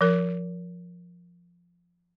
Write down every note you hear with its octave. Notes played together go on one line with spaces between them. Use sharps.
F3 A#4